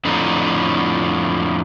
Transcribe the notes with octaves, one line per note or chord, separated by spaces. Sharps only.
F2 A2 D3 D#4